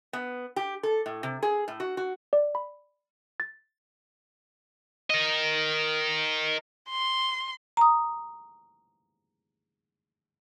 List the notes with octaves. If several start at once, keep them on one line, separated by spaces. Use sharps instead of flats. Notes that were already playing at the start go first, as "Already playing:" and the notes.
B3
G4
A4
A2
C3
G#4
A2
F#4
F#4
D5
B5
A6
A#4 D#5
C6
A#5 D#6